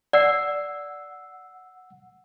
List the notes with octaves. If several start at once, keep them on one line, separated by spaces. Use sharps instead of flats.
D5 F#5 E6 C7